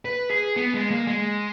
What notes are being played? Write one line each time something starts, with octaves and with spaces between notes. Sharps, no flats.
B4
G#4
B3
G#3
A#3
G#3